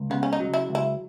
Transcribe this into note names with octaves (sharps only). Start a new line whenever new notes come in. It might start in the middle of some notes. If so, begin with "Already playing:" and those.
Already playing: C#2
C#3 B3
C#4
D#4
F#3
E4
C#2
E4